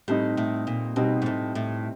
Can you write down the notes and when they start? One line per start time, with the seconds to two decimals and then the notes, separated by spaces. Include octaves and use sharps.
0.08 A2 G3 C4 D#4
0.37 A2
0.67 A#2
0.96 B2 G3 C4 D#4
1.22 G#2
1.26 A2
1.55 A2